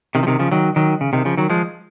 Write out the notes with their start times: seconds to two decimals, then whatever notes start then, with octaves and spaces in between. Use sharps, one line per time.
0.15 C3 D#3
0.23 F3
0.27 C3 D#3
0.39 C#3 F3
0.52 D#3 F#3
0.76 D#3 F#3
1.01 C#3
1.13 C3 D#3
1.25 C#3 F3
1.38 D#3 F#3
1.50 F3 G#3